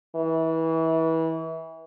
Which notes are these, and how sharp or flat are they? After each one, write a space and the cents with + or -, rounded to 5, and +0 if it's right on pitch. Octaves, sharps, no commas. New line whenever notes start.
E3 -25